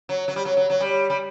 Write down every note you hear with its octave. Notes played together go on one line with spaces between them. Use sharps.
F#3
F#3
G3
F#3
F#3
F#3
G3
G3